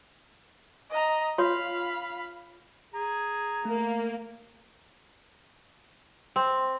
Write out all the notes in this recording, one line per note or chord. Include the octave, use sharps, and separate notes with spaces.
D#5 A#5
F4 C#5 F5 B5 C6
G#4 A#5
A3 A#3
C4